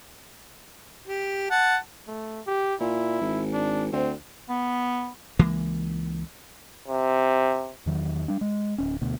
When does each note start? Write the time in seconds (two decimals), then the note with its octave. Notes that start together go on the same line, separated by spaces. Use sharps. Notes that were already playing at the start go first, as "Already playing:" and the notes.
1.08 G4
1.50 F#5 A5
2.08 A3
2.47 G4
2.80 A#2 E4
3.21 G#1
3.53 D4
3.93 D2 C4
4.49 B3
5.39 C#2 E3 G#3 A#3
6.88 C3
7.86 E2 D#3 F#3
8.28 G3 D4
8.41 G#3
8.78 D1 C#4
9.01 D2 B2 B3